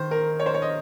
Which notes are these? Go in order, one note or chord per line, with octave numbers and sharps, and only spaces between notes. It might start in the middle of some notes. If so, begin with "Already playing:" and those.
Already playing: D#3 C5
A#4
C#5
C5
C#5
D#5